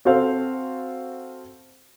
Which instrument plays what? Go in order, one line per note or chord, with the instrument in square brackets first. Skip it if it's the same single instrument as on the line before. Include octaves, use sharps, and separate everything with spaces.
[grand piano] C4 F#4 A4 C5 F5